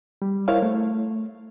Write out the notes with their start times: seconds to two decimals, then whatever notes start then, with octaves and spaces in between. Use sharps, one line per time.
0.22 G3
0.48 E4 A#4 C5 C#5 F5
0.62 A3